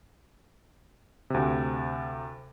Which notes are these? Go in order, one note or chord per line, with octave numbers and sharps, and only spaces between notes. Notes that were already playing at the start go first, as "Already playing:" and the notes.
D2 C3